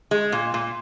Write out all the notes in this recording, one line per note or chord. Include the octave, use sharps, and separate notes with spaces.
G#3
A#2
A#2